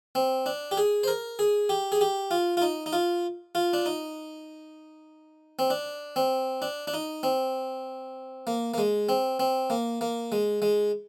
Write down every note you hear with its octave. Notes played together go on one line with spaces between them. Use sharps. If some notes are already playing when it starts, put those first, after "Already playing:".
C4
D4
G4
G#4
C5
A#4
G#4
G4
G#4
G4
F4
F4
D#4
D#4
F4
F4
D4
D#4
C4
D4
C4
D4
D4
D#4
C4
A#3
A#3
G#3
C4
C4
A#3
A#3
G#3
G#3